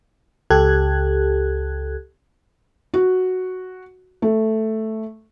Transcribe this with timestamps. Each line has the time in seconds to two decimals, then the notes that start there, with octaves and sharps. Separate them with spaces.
0.50 C#2 G4 A4 F#6 G#6
2.94 F#4
4.22 A3